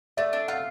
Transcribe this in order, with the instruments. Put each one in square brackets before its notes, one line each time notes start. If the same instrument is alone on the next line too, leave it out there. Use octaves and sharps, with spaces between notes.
[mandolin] A3 [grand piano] D5 E5
[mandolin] D4
[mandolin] F4 [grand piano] E5 F#5